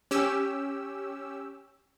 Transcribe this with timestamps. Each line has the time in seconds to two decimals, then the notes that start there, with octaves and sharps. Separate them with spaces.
0.11 C#4 G4 E6